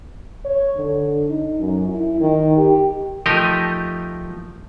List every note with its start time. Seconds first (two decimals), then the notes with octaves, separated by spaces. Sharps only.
0.45 C#5
0.77 D3
1.28 D#4
1.60 F#2
1.88 E4
2.20 D#3
2.57 G4
3.26 F3 A3 D#4 G4 A#4 D#5